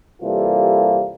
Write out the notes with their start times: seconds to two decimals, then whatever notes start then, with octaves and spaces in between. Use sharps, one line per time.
0.22 C3 E3 G3 A#3 F4 A4